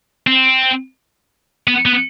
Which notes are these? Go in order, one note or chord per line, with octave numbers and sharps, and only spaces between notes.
C4
B3
B3